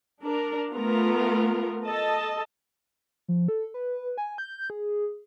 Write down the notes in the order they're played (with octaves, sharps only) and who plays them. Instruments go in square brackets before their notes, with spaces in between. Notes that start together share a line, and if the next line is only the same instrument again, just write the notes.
[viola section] D4 A#4
A3 B3 F4 A#4
A4 D#5 A5
[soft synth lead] F3
A4
B4
G#5
G6
G#4